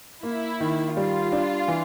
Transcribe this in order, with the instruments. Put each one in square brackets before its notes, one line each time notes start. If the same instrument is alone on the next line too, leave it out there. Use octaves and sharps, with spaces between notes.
[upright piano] A#3 [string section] E4
[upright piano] D#3
[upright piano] G3 [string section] F4
[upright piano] D4
E3